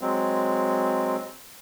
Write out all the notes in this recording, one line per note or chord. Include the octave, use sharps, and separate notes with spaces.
F#3 G#3 C4